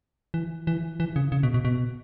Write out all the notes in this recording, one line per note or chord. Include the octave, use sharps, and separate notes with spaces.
E3
E3
E3
C#3
C#3
B2
B2
B2